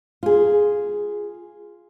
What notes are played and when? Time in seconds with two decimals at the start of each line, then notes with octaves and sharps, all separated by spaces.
0.23 F4 G#4